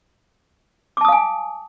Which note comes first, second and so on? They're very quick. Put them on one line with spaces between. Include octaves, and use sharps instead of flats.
D6 A5 D#6 F5 G#5